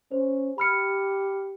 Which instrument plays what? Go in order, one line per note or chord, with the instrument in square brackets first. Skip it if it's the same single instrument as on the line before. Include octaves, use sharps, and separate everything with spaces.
[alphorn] C#4 [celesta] C5
[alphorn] G4 [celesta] B5 F6 C#7